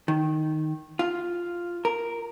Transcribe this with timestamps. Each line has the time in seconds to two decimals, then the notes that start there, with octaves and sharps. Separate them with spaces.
0.08 D#3
0.99 F4
1.85 A#4